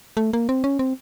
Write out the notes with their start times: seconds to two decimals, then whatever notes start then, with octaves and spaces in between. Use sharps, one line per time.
0.17 A3
0.33 A#3
0.49 C4
0.64 C#4
0.79 C4